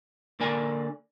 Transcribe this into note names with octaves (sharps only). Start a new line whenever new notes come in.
D3 A#3 A#4 D5 G#5